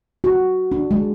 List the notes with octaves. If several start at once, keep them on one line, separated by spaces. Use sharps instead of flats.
F#4
D4
G#3